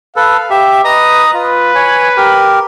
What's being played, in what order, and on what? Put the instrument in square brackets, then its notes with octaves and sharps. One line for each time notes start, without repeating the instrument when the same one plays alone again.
[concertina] A4 B4 [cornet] F5
[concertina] G4 E5
[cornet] B4 [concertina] D#5 A#5 D#6
[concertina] F4 [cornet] B4
[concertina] C#5 G#5
G4 A#4